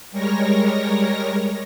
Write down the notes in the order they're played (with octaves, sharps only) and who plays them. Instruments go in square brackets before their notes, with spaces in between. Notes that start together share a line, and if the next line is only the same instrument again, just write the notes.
[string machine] G3 G#3 A#4 C#5 A#6